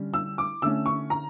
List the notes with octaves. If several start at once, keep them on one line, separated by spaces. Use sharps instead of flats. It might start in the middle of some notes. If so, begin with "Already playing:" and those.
Already playing: D3 G3 C#4
E6
D6
D3 A3 C#4 E6
C#6
A#5